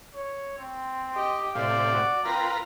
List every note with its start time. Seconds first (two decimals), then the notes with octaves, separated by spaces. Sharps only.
0.15 C#5
0.58 C4
1.14 G4 D#5
1.55 A2 C3 D5 F5
1.92 F#4
2.25 C4 F4 A#4 B4 A#5